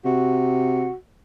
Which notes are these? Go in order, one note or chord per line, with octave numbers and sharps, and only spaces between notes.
C3 F#4